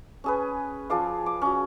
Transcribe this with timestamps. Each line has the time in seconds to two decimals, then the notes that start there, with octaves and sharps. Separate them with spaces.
0.24 C#4 G#4 B4
0.90 F3 G#4 D5 F5
1.26 D6
1.42 C#4 F#4